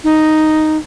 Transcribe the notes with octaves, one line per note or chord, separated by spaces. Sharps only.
D#4